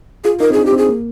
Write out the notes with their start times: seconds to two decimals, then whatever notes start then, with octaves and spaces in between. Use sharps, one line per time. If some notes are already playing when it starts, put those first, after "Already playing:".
0.24 F4 G#4
0.40 D#4 A#4
0.50 C4
0.53 D4 G#4
0.66 G4
0.73 C4
0.78 G#4
0.89 A#3